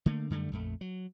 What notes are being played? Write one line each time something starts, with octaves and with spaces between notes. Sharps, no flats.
D3 A3 A#3
F#2 D3 G3 A3
A#1 F2 A3
F#3